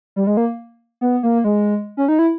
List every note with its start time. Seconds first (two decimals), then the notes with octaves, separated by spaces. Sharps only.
0.16 G3
0.27 G#3
0.37 A#3
1.01 B3
1.23 A#3
1.44 G#3
1.97 C#4
2.08 D#4
2.19 E4